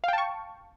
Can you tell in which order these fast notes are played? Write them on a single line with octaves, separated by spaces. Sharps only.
F5 G5 A5 C#6